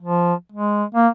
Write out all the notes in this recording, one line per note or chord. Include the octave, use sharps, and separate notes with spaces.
F3
G#3
A#3